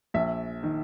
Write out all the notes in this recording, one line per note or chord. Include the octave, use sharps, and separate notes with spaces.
A#1 E5
D#3